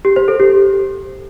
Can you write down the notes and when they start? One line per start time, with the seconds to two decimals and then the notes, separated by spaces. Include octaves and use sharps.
0.05 G4
0.16 C5
0.28 A4
0.40 G4